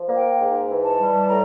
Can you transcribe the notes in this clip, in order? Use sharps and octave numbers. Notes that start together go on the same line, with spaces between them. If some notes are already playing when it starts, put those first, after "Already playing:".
Already playing: F3
A#3
G5
G#2
E3
A5
G3
A2 A#5